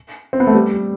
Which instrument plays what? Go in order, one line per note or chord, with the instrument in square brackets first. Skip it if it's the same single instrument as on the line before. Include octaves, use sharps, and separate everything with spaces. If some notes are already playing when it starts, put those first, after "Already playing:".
[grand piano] C4
B3
A3
G3